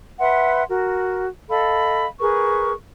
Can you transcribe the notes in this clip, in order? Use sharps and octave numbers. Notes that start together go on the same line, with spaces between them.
B4 E5 F#5 C6
F#4 A#4
A4 D#5 F5 B5
G#4 A#4 B4 C#6